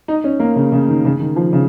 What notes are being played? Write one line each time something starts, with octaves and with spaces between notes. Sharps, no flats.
D#4
C#4
A#3
C#3
C#3
D#3
C#3
D#3
F3
C#3